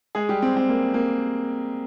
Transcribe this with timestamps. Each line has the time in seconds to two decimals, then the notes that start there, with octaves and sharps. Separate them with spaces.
0.15 G#3 G#4
0.29 G3 G4
0.42 C4
0.57 C4
0.69 A#3
0.94 A#3